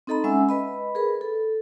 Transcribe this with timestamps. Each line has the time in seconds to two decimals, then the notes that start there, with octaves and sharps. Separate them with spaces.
0.07 C4 D#4 A4 D#5 A#5 B5
0.24 G#3 C#4 E5 F#5 G#5 E6
0.49 B4 D#5 B5
0.95 G#4 A#4 B4 B5
1.21 A4